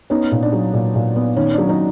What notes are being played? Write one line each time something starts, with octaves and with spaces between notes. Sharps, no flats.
B3 C#4 D#4
A#2
D4
F#3
A#2
A#2
B3
D#3 C#4
D4
F#3
C#4 D#4